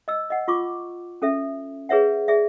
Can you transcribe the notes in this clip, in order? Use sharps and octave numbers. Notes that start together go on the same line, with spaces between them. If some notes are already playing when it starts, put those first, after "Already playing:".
D#5 E6
D#5 F#5
F4 C#6 D6
C#4 A4 E5
G#4 B4 C#5 E5 F#5
G#4 D5 E5